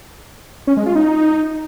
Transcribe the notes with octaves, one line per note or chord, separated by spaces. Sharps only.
C#4
G#3
F4
D#4